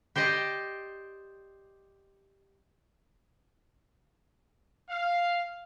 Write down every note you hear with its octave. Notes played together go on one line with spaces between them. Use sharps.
G4 C5 D5 D#5
F5